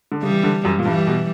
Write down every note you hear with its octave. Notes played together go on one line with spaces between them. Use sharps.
D3
C#3 E3 G3
D3
F#2
A#2
G2 E3 G3
B2